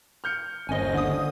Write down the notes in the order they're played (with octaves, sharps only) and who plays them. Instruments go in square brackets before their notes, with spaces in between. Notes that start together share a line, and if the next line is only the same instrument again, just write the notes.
[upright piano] F6 G6 C#7
[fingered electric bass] G1 D#2 [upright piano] C#4 C5 [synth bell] D#5 G#5
[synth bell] D3 D#6